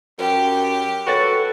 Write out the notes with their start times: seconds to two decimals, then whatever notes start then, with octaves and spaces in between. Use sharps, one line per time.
0.19 F#2 G4
1.07 F#4 A4 B4 C#5 A6